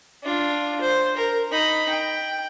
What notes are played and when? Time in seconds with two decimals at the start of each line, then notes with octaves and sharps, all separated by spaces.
0.23 D4 F4
0.81 C5
1.17 A#4
1.51 D#4 B5
1.90 G5